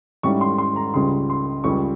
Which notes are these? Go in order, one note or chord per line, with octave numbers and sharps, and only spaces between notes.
G#2 G3 C#4 E4 C#6
C6
C6
A#5
C#2 C#3 G3 C6
C6
C#2 C#3 G3 C#6